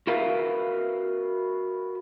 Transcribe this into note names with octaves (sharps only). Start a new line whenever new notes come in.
F#4 A#4 B4 E5 F5